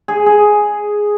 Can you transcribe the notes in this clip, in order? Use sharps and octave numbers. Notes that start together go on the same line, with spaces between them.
G#4
G#4